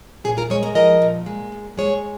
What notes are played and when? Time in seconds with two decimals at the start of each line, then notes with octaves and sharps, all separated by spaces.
0.24 A#2 G#4 C#5
0.37 F4 A#4
0.50 G#3 G#4 C#5
0.63 A#4 D#5
0.75 F3 A#4 D#5
1.02 A#2
1.26 G#3
1.52 A#2
1.77 G#3 G#4 C#5